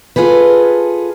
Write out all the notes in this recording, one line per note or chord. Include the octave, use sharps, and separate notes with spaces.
F4 G#4 A4 B4